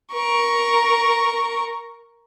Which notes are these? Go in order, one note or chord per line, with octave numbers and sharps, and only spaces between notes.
A#4 C#6